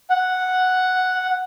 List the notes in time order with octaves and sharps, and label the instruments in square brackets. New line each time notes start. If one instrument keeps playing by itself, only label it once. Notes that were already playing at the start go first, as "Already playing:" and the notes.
[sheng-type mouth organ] F#5